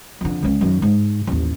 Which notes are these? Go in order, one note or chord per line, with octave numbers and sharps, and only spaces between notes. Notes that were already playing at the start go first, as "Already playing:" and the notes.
F2 D3
C#2 C#4
F#2 D#3
G#2
A1 D#2